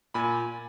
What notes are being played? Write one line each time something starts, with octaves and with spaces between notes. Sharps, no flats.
A#2 G#5 B5